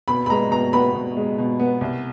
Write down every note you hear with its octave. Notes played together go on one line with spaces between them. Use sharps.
B2 B5
B5
G#3 A#5
B2 A#5
B3 B5
B2
G#3
B2
B3
C2